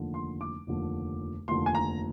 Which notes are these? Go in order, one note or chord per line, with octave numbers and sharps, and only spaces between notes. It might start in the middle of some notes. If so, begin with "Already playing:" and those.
Already playing: F1 D#2 D3 F3
C6
D6
F1 D#2 D3 F3
F1 D#2 D3 F3 C6
G#5
A#5